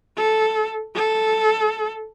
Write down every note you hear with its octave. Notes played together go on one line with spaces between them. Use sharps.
A4
A4